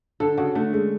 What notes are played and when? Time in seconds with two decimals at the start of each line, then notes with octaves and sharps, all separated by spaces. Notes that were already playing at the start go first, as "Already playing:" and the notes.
0.20 D3 A4
0.38 C#3 F#4
0.55 D3 A3
0.73 G#3